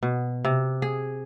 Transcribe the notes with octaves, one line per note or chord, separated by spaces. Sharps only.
B2
C3
G#4